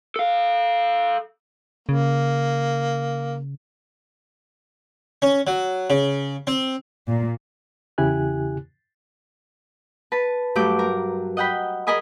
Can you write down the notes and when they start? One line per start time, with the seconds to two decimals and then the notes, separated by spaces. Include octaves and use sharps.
0.16 A4 F5
1.89 C#3 A#3
5.22 C#4
5.47 F#3
5.90 C#3
6.47 C4
7.08 A#2
7.98 E2 C#3 E4 G4 G#5 F#6
10.12 B4 A5
10.55 G2 F#3 A3 G4 D6 G6
10.79 A#4
11.37 D#5 F#5 G5 B5
11.87 G#4 A#4 D#5 G#5 B5 D#6